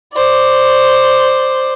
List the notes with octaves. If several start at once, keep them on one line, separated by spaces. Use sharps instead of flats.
C5 D5